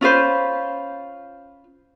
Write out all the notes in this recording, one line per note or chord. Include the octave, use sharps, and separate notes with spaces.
C#4 F4 B4 C5